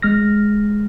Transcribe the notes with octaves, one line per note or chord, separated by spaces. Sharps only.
G#3 F6 A#6